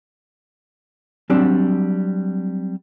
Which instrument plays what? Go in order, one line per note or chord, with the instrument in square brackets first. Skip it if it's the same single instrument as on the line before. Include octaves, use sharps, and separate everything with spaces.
[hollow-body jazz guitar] F#3 G3 C4 D4